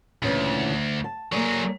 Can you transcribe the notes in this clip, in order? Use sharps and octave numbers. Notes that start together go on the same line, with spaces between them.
D2 A#2 C#3 E3
A5
F#3 A#3 G#4 A4 D5